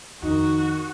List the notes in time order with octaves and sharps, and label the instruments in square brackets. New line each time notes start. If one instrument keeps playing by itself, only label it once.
[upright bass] F2 [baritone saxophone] D#3 [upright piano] D#4 [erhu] F#4